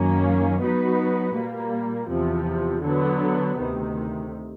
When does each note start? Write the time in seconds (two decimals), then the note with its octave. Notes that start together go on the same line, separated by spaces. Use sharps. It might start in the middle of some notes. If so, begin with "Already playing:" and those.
Already playing: F#2 D#3 F#3 A#3 C#4
0.60 F#3 B3 D#4 F#4 B4
1.35 A#2 G3 A#3
2.08 E2 C3 F3
2.83 D3 F#3 B3
3.56 D2 C3 D#3